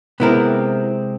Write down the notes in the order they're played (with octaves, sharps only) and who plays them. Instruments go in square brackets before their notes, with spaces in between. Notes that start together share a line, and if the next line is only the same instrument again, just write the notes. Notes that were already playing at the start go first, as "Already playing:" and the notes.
[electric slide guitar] C3 G#3 C4 [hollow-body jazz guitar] B3 E4 A#4